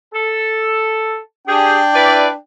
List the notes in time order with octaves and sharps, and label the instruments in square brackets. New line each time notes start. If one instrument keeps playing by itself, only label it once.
[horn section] A4
[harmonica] D4 G5 [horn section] G4 G#4
[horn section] E4 B4 D5